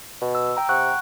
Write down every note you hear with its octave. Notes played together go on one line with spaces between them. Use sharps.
B2
E6
G5 A#5
C3 F#5 C#6 F#6